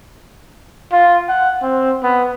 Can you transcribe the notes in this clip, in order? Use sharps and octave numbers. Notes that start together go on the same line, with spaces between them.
F4
F#5
C4
B3